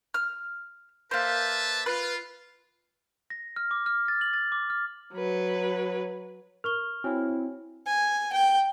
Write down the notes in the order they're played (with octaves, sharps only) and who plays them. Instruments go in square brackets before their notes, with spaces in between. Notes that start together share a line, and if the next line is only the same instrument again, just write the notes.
[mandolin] F6
[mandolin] A#3 C5 [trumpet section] B4 E5 A5
[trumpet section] F4 [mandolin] B4
[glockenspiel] A#6
F6
D6
F6
A6
F#7
A6
D6
F6
[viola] F#3 B4
[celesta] A#4 C#6 G7 [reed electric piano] F6
[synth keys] C4 E4 [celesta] F#4 C#5 G#5
[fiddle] G#5
G5